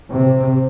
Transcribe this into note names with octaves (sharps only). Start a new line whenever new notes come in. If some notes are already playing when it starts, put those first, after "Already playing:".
C3